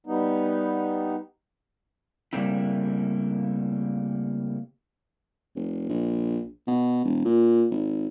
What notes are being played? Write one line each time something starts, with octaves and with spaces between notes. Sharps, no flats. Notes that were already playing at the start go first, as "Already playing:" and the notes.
G3 B3 D#4
C#3 G3 A3 A#3 C4 E4
F1
A#1
B2
E1
A#2
G#1